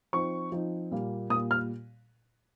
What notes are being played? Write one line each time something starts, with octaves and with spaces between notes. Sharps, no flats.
F3 C4 D#4 C#6
F3 C4 D#4
A#2 G3 A#3
A#2 G3 A#3 D#6
F6